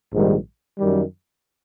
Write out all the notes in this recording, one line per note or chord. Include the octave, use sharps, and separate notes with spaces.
A#1 G#2 D#3 G3
F#2 D#3 G3